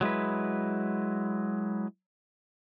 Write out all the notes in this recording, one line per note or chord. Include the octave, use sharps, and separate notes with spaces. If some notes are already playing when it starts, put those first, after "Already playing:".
F#3 G#3 E4 B4